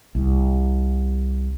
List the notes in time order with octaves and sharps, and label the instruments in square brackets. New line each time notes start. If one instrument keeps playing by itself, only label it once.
[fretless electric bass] C2